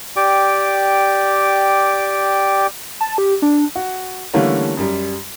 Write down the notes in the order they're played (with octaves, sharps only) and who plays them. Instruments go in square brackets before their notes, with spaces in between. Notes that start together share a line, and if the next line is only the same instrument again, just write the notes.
[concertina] G4 D5 G5 D6
[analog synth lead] A5
G4
D4
[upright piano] F#4
D3 E3 G3 A3 A#3 C#4
F#2 G3